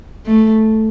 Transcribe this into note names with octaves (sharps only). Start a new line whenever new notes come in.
A3